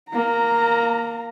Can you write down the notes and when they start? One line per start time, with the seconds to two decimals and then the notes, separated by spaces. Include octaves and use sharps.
0.11 A#3 A#5